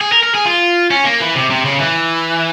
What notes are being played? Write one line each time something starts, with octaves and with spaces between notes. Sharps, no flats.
G#4
A#4
A#4
G#4
F4
C#4
A#3
E3
C3
C3
C#3
E3